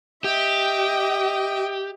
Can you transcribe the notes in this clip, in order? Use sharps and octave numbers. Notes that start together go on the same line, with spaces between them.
G4 D#5 E5 G5